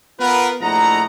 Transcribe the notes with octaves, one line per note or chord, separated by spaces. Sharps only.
B3 F4 A#4 B4
A#1 A3 E4 D#5 F#5 A#5